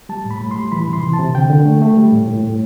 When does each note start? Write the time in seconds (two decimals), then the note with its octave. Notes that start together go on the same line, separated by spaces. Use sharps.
0.09 G3 A5
0.25 A2
0.31 B5
0.41 A2
0.51 C6
0.57 G3
0.72 E3 B5
0.88 C3
0.93 C6
1.03 E3
1.14 A5
1.19 C3
1.35 D3 G5
1.50 D3
1.66 A3
1.82 A3
1.97 G3
2.13 A2
2.28 A2
2.44 A2